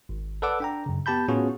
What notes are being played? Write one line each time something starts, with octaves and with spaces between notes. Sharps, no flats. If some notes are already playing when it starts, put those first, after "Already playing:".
G#1
A4 B4 D5 F#5 D6 E6
D4 G5 A#5
F#2 C#3
B3 G4 A5 B5 G6
A2 B3 C#4 F4 F#4 G#4